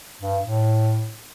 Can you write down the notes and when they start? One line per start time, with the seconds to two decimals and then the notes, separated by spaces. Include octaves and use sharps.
0.21 G2
0.43 A2